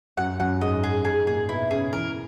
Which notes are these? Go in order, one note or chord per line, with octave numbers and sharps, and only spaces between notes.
F#2 F#3 F#5
F#2 F#3 F#5
G#2 G#3 D#5
G#4
G#2 G#3 G#4
A#2 A#3 G#4
B2 B3 E4
C#3 C#4 G#4
E3 E4 A#4